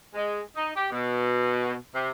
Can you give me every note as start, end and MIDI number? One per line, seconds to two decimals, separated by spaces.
0.14 0.39 56
0.55 0.70 63
0.76 0.87 67
0.92 1.73 47
1.93 2.09 48